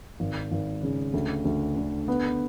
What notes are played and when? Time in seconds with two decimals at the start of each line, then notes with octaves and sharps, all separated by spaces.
0.20 G#1
0.51 G#1
0.83 C#3
1.14 D2
1.45 D2
1.77 D3
2.08 B3